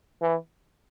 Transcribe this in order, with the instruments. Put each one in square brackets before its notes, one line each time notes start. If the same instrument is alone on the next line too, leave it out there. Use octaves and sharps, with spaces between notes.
[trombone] E3